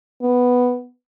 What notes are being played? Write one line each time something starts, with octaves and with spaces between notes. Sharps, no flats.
B3